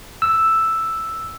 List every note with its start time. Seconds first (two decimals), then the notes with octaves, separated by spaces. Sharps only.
0.22 E6